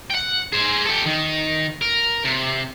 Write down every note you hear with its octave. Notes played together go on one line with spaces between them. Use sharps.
F#5 G5
G#4 C5
G4 A4
D#3
A#4
C3